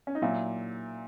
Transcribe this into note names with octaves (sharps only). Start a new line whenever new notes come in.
C#4
D#4
A#2 F#3 E4